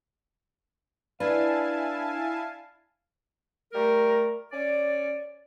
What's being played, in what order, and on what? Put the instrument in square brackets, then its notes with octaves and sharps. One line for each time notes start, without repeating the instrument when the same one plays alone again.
[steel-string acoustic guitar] D4 [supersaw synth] E4 G#5 A5 [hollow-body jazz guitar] B4 [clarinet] F5
[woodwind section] G3 A3 A#4
C#4 C#5 D5